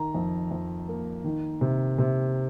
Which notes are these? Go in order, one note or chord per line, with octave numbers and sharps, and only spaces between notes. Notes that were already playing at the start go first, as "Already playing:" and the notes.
Already playing: D#3 A#5
F2
F2
A#3
D#3
C3
C3